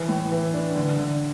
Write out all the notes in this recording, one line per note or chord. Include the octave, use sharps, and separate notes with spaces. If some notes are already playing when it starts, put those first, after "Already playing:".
Already playing: E3
A2
E3
D4
D3
D3